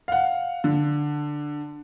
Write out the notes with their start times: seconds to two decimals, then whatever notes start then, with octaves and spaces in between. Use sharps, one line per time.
0.08 F5 F#5
0.64 D3